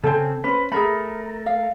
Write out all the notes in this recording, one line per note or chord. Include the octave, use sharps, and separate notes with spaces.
C#3 C4 A4 C5 G#5
C#4 B4 C5
A3 G#4 A#4 E5 B5
F5